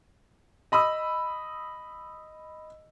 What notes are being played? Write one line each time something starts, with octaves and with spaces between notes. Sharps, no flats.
D#5 B5 D#6 E6